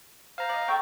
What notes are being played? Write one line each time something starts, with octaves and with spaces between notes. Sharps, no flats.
C5 F5 A#5
D5 D#5
A4 G5 C#6